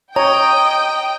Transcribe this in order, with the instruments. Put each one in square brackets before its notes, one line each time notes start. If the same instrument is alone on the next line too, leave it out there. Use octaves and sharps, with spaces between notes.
[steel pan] C#5 [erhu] D#5 [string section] G5 [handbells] A#5